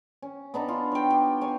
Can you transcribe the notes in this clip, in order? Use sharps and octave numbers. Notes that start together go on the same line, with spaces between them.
C#4
B3 D4 D#4
F4
C#5 G5
G4
C#5 G#5